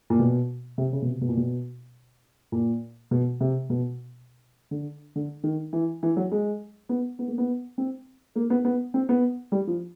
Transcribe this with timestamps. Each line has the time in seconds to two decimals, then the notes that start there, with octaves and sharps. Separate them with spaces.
0.10 A#2
0.19 B2
0.78 C3
0.93 C#3
1.02 B2
1.07 C3
1.21 B2
1.29 A#2
1.37 B2
2.52 A#2
3.11 B2
3.40 C3
3.70 B2
4.71 D3
5.16 D3
5.43 D#3
5.73 E3
6.03 E3
6.17 F#3
6.32 G#3
6.89 B3
7.19 B3
7.28 A#3
7.38 B3
7.78 C4
8.36 A#3
8.50 B3
8.65 B3
8.94 C4
9.09 B3
9.52 G3
9.67 F3